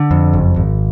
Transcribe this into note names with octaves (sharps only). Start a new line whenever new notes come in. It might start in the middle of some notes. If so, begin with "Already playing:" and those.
Already playing: D3
F2
F#1
G#1